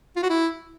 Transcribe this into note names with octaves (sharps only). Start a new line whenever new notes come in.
F4
F#4
E4